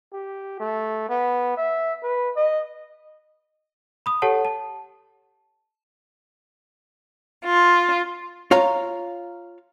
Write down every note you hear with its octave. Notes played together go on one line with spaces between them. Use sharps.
G4
A3
B3
E5
B4
D#5
B5 D#6
G4 A4 C#5 F#5 A5
A5
F4
F4 C#5 F5 A#5